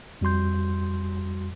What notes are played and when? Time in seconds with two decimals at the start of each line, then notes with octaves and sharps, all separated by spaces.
0.21 F2 G3 F#4 C6 G6